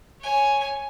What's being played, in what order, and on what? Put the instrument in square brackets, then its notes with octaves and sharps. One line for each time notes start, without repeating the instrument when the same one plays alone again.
[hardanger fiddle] C#5 G#5